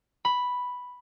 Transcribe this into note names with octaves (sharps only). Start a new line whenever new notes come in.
B5